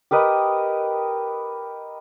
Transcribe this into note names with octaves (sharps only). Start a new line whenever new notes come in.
G4 A#4 B4 D#5